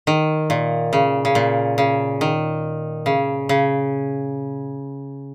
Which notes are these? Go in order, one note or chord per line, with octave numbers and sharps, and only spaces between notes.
D#3
A#2
C#3
C#3
A#2
C#3
D#3
C#3
C#3